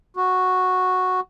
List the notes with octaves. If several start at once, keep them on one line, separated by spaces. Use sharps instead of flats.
F#4